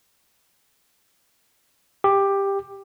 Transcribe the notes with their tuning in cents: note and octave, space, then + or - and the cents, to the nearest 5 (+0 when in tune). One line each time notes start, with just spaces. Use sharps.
G4 +10